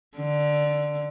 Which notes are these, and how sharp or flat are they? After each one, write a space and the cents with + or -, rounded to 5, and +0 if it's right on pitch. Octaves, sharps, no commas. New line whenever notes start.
D3 +10